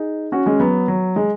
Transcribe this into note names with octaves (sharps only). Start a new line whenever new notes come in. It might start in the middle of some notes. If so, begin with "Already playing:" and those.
Already playing: D#4 G#4
C#4 F#4
G#3 C#4
F#3 B3
F#3
G#3